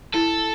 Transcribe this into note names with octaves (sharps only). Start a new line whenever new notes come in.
E4 A4